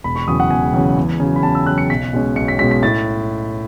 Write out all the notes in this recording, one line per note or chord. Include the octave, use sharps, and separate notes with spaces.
E1 B5
C#6
E2 C#3 F#3 D#6
F#5
E1 G#5
E2 C#3 F#3
E2
C#3 F#3
B5
E2 A5
E6
C#3 F#3 F#6
C#7
B1 B6
B2 G#3 C#4
B1 C#7
B6
B2 G#3 C#4 B6
B6
A2 A6